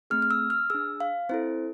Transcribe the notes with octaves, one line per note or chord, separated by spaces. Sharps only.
A3 C4 G#4 F6
F6
E6
F6
D4 G#4 E6
F5
C4 E4 A4 C5